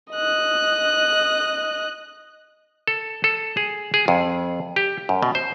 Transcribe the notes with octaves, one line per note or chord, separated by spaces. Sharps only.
D#5 F#6
A4
A4
G#4
G#4
F2
G4
F#2
B2
C5